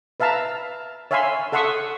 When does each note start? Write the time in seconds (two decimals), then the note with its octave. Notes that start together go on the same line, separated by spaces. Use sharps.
0.20 B4 E5 F5 A5 A#5
1.11 C#5 E5 F5 G#5 B5 C6
1.52 A4 E5 F#5 C6 C#6 D#6